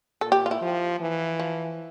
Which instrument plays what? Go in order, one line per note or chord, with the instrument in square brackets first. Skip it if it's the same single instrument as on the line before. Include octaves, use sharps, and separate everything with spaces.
[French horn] A#2 [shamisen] A4
[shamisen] G4
F4
E4
[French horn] F3
E3
[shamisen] F3